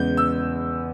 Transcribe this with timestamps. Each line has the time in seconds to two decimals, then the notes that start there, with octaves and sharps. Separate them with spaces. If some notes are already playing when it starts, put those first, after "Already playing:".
Already playing: E2 C#3 G#3 B3 G6
0.17 E6